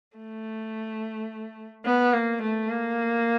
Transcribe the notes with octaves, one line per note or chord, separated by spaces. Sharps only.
A3
B3
A#3
A3
A#3